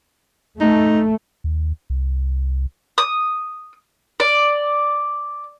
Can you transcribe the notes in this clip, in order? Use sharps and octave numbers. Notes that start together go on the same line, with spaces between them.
A3 D#4
D#2
C2
D#6
D5